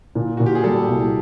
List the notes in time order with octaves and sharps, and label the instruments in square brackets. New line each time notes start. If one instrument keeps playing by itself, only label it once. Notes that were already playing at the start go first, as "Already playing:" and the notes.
[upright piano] A#2
[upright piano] A#2 [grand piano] F#4
[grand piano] G4
G#4
[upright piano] G3 [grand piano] A4
[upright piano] C2